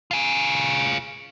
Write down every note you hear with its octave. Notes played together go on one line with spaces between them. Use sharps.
F4 G#4